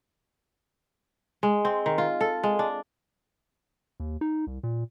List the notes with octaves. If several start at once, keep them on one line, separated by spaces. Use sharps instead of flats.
G#3
C4
D#3
F4
A4
G#3
D4
D#2
D#4
C2
A#2